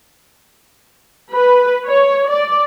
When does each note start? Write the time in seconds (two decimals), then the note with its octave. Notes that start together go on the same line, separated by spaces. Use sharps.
1.34 B4
1.88 C#5
2.31 D5